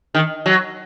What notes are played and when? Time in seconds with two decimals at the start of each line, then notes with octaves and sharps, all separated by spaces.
0.14 D#3
0.46 F#3